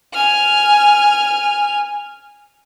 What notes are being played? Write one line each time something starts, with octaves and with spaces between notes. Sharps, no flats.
G#5 F6